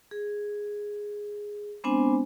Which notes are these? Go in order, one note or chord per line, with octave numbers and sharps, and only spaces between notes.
G#4
G#3 B3 C4 D4 C5 G#5